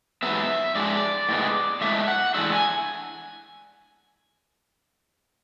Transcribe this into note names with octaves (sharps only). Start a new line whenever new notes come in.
G#2 F#3 B3 E5
G#2 G#3 D4 D5
A2 G#3 B3
A2 G#3 D4 E5
F#5
A2 E3 G#3 D4 E5
G#5